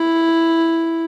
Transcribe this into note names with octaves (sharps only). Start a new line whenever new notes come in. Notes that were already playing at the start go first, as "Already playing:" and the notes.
Already playing: E4